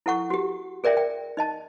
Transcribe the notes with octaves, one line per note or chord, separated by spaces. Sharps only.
E4 A4 F#5 C#6
F#4 G4
G#4 A#4 D5 E5 G5
G5
D#4 D#5 A5